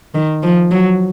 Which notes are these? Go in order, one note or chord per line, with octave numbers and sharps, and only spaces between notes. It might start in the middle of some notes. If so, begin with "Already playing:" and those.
D#3
F3
F#3